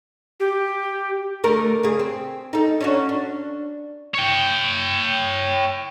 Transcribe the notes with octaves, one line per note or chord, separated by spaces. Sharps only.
G4
D3 A3 A#4
C#3 G#4
C4
D#4 A4
C#4 D4 F#4
D4
C#5 G5